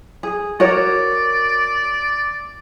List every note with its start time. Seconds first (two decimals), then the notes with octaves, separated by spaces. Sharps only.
0.23 G#4
0.60 F#4 A#4 C#5 D5